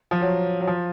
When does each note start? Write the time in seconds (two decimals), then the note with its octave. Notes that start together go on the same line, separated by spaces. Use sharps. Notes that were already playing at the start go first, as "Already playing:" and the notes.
0.11 F3
0.21 F#3
0.60 F#3
0.67 F3